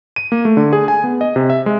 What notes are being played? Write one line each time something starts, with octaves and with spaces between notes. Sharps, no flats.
D#7
A#3
A3
D3
G#4
G#5
B3
D#5
C3
E5
G#3